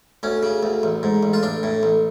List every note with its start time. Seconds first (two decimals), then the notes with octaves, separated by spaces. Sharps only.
0.23 D2 C#4
0.43 C#3
0.63 D2
0.83 A1
1.03 G#2
1.23 A1
1.33 F4
1.43 A1 D4
1.63 A2
1.83 A1